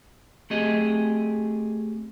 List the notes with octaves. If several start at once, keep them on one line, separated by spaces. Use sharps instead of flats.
A3 C4 G4 G#4 D#5